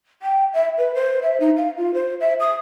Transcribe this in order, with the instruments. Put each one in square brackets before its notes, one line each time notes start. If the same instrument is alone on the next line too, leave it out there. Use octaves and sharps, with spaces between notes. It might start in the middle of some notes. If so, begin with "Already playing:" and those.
[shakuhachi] G5
E5
B4
C5
E5
D#4
F5
F4
C5
E5
D#6